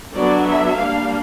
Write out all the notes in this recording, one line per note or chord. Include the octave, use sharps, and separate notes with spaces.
D3 F#3 B3 D4 D5
E5
G3 A#3 D4 F5